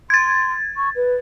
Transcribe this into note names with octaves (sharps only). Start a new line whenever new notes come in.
C6 G#6 A6
C#6
B4